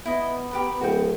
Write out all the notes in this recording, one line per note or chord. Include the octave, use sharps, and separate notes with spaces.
B3 E4 D#5
G4 A#4 B4
D1 F#4 G5